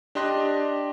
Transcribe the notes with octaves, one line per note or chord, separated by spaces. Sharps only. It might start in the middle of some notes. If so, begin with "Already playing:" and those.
D4 G4 D#5 C6 F#6 A#6